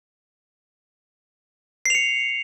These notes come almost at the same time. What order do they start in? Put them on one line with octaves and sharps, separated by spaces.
C7 F7 C#7